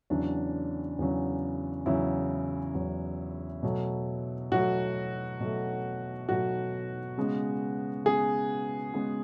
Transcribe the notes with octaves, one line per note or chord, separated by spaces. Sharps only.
E2 C#3 F#3 D4
E2 C#3 F#3
E2 C#3 F#3 E4
E2 C#3 F#3
B2 F#3 A3
B2 F#3 A3 F#4
B2 F#3 A3
B2 F#3 A3 F#4
C#3 G#3 B3
C#3 G#3 B3 G#4
C#3 G#3 B3